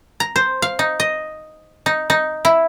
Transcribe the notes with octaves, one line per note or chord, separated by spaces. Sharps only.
A#5
C5
F5
D#4
D#5
D#4
D#4
E4